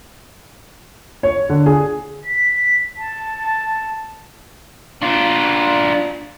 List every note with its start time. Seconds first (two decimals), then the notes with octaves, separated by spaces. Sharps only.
1.23 C#5
1.49 D3
1.66 G#4
2.25 B6
2.98 A5
5.02 D4 F4